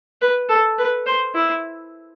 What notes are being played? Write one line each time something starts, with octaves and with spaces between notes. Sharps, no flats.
B4
A4
B4
C5
E4